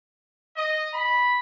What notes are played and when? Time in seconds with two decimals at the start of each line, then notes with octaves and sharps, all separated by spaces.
0.56 D#5
0.94 B5